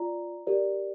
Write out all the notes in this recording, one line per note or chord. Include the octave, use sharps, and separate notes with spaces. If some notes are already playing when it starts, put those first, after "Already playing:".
Already playing: F4 D5 A#5
G4 A#4 D5